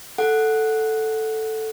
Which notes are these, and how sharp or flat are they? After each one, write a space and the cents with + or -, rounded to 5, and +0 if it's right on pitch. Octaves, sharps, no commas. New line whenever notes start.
A4 +0 F#5 +0